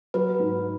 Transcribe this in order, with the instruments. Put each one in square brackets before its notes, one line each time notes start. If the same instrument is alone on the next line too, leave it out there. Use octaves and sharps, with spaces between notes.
[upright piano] F#3 [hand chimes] B4
[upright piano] G#2